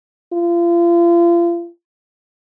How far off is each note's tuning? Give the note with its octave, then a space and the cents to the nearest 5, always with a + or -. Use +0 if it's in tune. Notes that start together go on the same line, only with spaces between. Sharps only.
F4 -35